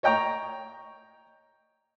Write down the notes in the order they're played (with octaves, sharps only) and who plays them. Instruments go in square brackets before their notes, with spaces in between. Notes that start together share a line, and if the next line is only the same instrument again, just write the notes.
[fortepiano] C#5 D#5 G5 A#5 C#6